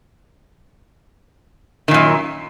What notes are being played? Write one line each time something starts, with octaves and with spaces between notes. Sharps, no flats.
F#2 A#2 D#3